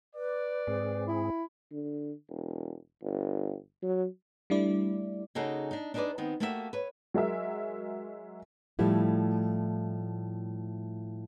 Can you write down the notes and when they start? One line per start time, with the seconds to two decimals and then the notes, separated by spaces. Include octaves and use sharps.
0.15 B4 D5
0.67 G#2 C4 G#4
1.07 E4
1.72 D3
2.29 E1
3.03 G1
3.82 F#3
4.50 G3 A3 D4 E4 D5
5.35 C#3 A#3 D#4 F#4 G#4 A4
5.71 D4 D#4
5.94 D4 D#4 G#4 A#4 B4 D5
6.18 D#3 B3 C4
6.40 A3 A#3 F#4 G4 C5 E5
6.73 B4 C#5
7.14 F#3 G#3 A#4 E5
8.79 A2 F3 G3 A3 E4